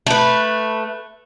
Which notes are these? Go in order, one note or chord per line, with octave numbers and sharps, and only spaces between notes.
A3 B4